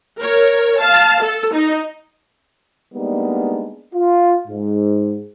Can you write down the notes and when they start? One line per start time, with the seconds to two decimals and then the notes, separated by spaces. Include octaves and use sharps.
0.20 A#4 C#5
0.81 F5 A5
1.21 A4
1.53 D#4
2.93 G3 G#3 A#3 B3 D4 D#4
3.94 F4
4.47 G#2